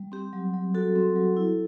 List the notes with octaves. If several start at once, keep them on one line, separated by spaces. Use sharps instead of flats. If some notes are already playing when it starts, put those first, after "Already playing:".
Already playing: G3
C4 G4
F#3
F#3
F#4 A4
C4
F#3
E4